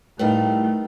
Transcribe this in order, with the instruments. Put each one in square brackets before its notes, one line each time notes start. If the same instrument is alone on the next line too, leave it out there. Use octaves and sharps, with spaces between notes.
[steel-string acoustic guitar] A2 G3 F5 [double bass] A3 [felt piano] D#4 A#4 B4